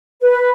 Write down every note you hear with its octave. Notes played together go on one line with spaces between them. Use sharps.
B4